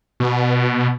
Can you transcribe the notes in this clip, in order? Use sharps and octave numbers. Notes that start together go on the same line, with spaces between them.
B2